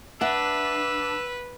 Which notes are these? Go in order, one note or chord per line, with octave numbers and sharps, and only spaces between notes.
D4 B4 E5 F#5 E6